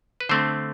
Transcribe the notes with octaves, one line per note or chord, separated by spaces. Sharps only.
B4
D3 A3 C4 C5